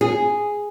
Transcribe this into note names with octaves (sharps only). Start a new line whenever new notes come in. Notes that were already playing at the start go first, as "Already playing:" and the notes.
G#4